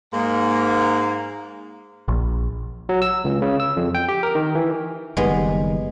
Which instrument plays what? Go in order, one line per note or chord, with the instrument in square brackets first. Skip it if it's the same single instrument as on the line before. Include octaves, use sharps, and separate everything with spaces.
[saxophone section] G#2 A#3
[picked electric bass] A#1
[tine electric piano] F#3
E6
C#2
C#3
E6
F2
G5
G4
A#4
D#3
E3
[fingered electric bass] F#1 D#3 G3 [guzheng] G#3 B3